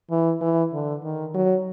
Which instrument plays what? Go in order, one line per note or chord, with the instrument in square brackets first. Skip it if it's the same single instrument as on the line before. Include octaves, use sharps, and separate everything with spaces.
[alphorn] E3
E3
D3
D#3
F#3